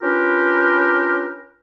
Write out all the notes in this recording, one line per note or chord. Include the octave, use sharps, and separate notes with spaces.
C#4 D4 F4 G4 A#4 B4